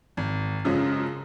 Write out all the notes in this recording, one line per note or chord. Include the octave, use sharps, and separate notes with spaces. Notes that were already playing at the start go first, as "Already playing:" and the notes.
G#1
F#2 C#3 F3 G#3